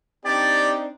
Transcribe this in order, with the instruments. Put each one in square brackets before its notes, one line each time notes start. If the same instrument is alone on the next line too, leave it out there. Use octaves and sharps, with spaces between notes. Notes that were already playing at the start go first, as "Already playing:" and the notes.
[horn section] C4 D4 D#4 [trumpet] G4 [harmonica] D5 [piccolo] A6